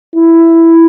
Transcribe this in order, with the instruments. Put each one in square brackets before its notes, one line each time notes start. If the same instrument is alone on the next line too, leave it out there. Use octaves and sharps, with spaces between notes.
[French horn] E4